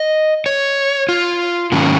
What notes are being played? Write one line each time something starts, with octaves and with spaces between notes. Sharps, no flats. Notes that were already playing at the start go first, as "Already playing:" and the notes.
Already playing: D#5
C#5
F4
G#2 D#3 F#3 A#3 C#4